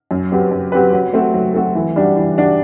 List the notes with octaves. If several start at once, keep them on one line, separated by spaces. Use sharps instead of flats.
F#2
F#3 C4 G4 B4
F#2
F#3 C4 G4 B4
F#3
A3 C4 F#4
F#3
A3 C4 F#4
E3
G3 D4 F#4
E3
G3 D4 F#4